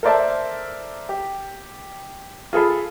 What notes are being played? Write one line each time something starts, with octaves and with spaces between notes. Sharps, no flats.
A4 A#4 C5 D5 E5 A5
G4
F4 G#4 A4 B5